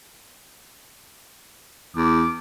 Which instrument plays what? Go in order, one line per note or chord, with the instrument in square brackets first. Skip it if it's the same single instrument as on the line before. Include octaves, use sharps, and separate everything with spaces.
[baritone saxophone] E2 [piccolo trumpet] D6